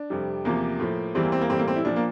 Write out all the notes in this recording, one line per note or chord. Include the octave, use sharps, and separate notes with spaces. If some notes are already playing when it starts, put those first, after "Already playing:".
Already playing: D4
F2 C3 G3
E2 C3 F3 A#3
A2 F3
E2 E3 G3 C4
A#3
C4
A#3
A2 E3 G3 C4
A#3
C4
E4
A#2 F3 D4
A#3